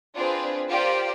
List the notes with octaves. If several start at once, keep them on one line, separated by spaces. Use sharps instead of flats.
C4 D4 F4 G#4 B4
F4 G4 A#4 C5 D5